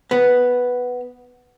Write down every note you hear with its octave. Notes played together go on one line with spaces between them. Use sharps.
B3